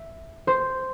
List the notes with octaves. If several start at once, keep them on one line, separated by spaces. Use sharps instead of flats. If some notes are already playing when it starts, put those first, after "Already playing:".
Already playing: E5
C5